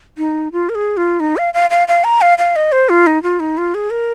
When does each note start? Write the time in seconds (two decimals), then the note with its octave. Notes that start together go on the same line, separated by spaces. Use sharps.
0.18 D#4
0.52 F4
0.69 A#4
0.75 G#4
0.97 F4
1.20 D#4
1.37 F5
1.54 F5
1.70 F5
1.88 F5
2.04 A#5
2.21 F5
2.38 F5
2.56 D#5
2.72 C5
2.89 F4
3.07 D#4
3.23 F4
3.40 D#4
3.58 F4
3.74 G#4
3.90 A#4